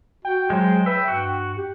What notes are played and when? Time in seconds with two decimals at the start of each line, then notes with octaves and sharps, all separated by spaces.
0.25 F#4 G5
0.50 F#3 G#3 C5
0.86 B4 E5
1.08 G2 F#4
1.57 G4